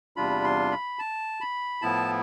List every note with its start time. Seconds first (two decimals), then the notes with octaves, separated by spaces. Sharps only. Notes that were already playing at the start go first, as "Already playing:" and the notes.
0.16 E2 C3 G3 D4 F4 B5
0.44 C6
0.71 B5
0.99 A5
1.41 B5
1.82 A2 F3 B3 E4 A5